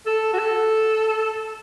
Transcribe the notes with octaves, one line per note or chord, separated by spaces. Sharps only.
A4
F#4
A4